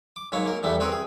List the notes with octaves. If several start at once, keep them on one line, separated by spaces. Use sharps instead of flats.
D6
G#2 F#3 A#3 C#5
A#3 A#4
E2 G3 A3 B3
C4 F#4 G#4 A#4
G#4